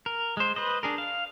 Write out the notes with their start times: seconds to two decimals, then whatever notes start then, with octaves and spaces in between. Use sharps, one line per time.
0.06 A#4
0.37 G#3 C5
0.56 B4 C5 D#5
0.83 D4 G#4 A#4
0.98 F5